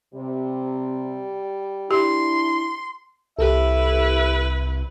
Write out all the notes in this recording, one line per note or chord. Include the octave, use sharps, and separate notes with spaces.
C3 G3
D4 E4 G4 C6
C2 E4 G4 A4 B4 E5